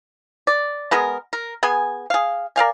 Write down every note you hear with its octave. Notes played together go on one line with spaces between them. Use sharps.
D5
G#3 B3 G#4 A#4
A#4
B3 G#4 G#5
G#4 F5
A#4 D5 F5 G#5